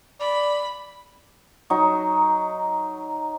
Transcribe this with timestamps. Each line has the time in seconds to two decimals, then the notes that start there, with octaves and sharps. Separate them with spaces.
0.20 D5 B5
1.70 F#3 D#4 C#6